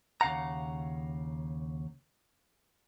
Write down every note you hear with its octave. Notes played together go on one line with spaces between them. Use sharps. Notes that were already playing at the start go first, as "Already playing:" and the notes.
D#2 C#3 F5 F#5 A#5